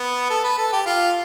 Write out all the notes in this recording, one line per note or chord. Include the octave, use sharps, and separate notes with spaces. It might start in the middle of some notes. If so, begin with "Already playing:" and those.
Already playing: B3
A4
B4
A4
G4
F4